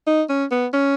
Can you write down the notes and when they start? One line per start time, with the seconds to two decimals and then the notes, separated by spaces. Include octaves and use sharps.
0.07 D#4
0.29 C#4
0.51 B3
0.74 C#4